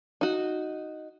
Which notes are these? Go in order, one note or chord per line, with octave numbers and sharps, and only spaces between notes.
D#4 F#4